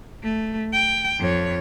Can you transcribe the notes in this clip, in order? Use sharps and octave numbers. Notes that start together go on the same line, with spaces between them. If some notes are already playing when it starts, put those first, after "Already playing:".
A3
G5
F2 C#5